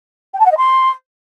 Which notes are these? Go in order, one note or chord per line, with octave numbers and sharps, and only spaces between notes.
G5
A5
F#5
D#5
C6